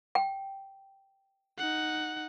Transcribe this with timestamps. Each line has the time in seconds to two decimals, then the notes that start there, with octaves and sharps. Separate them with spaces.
0.15 G5
1.58 D#4 F#5